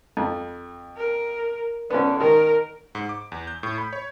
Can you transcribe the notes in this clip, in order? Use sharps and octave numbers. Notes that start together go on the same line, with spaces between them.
F2
A#4
D3 B3 C#4
D#3 A#4
G#2
D6
E2
G6
A2
B5
C#5